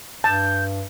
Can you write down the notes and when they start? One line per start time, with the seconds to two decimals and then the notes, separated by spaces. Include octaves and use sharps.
0.24 G2 A5 G6